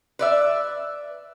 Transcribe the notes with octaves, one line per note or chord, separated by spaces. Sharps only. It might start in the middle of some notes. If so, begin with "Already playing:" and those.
B4 D5 E5